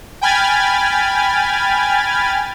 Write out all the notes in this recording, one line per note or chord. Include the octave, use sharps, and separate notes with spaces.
G5 G#5 B5 F6 G#6 A6